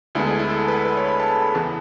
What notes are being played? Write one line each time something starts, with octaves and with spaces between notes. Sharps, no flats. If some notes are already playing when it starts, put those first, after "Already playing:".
D2 D3 G#3 B3 E4
G#4
E4
A4
B4
B4
C#5
B5
A5
A5
B5
E2 C#3 E3 B3 A5